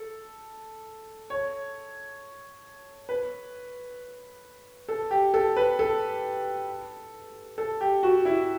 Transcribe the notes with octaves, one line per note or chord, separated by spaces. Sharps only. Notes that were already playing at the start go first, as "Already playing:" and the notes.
Already playing: A4
C#5
B4
A4
G4
A4
B4
A4
A4
G4
F#4
E4